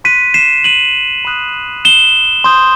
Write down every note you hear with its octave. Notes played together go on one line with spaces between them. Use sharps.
C6 F#6 B6 D#7
C7 E7
D#7 F#7
B5 D#6 F#6
E7 G7
C6 D#6 G6